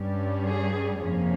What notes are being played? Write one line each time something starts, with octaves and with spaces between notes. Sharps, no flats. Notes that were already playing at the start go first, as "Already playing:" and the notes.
Already playing: G2 G3 C#4
G#4
F2 C3 F3 A#3 C#4